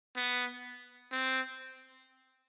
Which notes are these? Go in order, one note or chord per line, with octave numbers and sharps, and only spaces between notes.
B3
C4